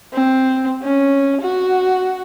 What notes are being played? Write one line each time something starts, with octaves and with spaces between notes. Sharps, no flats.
C4
C#4
F#4